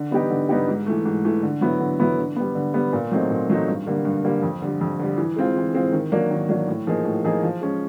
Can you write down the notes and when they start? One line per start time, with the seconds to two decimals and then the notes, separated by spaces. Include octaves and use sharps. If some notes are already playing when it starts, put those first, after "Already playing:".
Already playing: D3
0.11 G3 B3 D#4 G4
0.31 D3
0.49 G3 B3 D#4 G4
0.68 G#2
0.86 E3 A3
1.05 G#2
1.25 E3 A3
1.43 D3
1.61 F#3 B3 E4
1.80 D3
2.00 F#3 B3 E4
2.18 D3
2.36 G3 B3
2.55 D3
2.74 G3 B3
2.93 A#2
3.12 F#3 A3 C4 D#4
3.30 A#2
3.50 F#3 A3 C4 D#4
3.68 G2
3.86 D3 G3 A#3
4.05 G2
4.24 D3 G3 A#3
4.42 F2
4.62 D3 G3
4.81 F2
4.99 D3 G3
5.18 E3
5.36 G#3 C4 F4
5.56 E3
5.74 G#3 C4 F4
5.92 D#3
6.12 F#3 A#3 D4
6.30 D#3
6.49 F#3 A#3 D4
6.68 A2
6.87 F3 A#3 D#4 G#4
7.05 A2
7.24 F3 A#3 D#4 G#4
7.43 F3
7.61 G#3 C#4